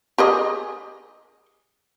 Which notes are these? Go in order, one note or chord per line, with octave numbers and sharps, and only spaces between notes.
G4 G#4 D#5